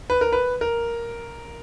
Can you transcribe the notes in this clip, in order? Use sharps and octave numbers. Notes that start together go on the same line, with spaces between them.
B4
A#4
B4
A#4